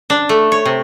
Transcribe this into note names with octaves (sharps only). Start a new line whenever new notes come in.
D4
A3
C#5
C3